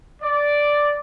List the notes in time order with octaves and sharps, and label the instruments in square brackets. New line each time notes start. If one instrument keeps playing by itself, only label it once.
[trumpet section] D5